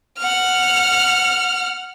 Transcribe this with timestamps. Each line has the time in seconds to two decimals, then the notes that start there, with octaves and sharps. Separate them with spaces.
0.18 F#5 F6